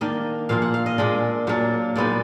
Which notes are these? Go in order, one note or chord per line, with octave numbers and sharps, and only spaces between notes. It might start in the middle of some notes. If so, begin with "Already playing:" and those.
D#3 A#3 D4 D#5
A#2 F3 A#3 F5
F#5
F5
D#5
A#2 G#3 D4 D5
A#2 F#3 A#3 D4
A#2 G#3 B3 D#4 D5